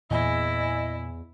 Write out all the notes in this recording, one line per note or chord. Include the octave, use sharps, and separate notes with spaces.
E2 A#2 E4 D#5 G#5